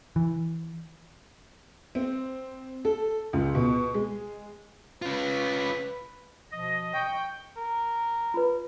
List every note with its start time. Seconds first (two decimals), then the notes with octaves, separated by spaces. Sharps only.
0.16 E3
1.95 C4
2.85 A4
3.33 C#2
3.55 B2
3.94 G#3
5.02 C#4 F4 B4
6.51 B2 F3 D#5
6.94 G5 C#6
7.57 A#4
8.34 F4 B4